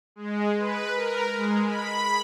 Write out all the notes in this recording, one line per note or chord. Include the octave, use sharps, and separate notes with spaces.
G#3
B4
A#4
G#3
B5